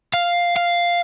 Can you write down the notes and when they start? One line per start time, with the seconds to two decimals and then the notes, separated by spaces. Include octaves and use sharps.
0.14 F5
0.56 F5